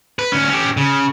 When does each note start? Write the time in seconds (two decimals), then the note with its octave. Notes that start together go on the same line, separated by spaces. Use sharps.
0.19 B4
0.32 D2 C#4
0.49 C#4 G4
0.77 C#3